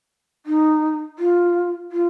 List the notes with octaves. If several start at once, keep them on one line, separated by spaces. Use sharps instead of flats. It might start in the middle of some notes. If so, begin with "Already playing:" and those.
D#4
F4
F4